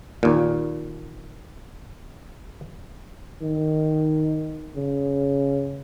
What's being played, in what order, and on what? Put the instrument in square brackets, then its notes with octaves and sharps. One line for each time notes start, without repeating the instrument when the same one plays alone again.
[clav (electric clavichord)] D#2 A#2
[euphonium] D#3
C#3